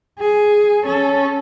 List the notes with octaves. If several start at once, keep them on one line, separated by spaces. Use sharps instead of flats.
G#4
C#4 A4